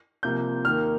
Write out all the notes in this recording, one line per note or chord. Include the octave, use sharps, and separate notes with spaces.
C2 C3 F3 A#3 G6
D#2 D#3 A#3 F6